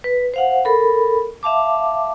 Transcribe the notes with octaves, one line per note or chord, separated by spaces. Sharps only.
B4
C5 F5 F#5
A4 A#4 B5
E5 F5 A5 D6